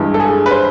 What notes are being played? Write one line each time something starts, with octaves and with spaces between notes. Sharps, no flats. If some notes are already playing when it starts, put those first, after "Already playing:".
Already playing: G2 E3 G#3
A4
G#4
B4
C5